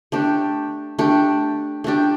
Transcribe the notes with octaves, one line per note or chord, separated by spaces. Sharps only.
A3 D4 G4
A3 D4 G4
A3 D4 G4